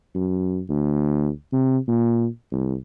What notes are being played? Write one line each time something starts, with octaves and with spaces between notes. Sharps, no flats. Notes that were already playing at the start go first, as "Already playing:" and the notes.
F#2
D2
C3
A#2
C2